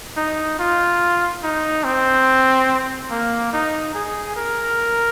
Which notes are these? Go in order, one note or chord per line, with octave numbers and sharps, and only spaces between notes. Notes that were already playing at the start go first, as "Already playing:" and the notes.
D#4
F4
D#4
C4
A#3
D#4
G#4
A#4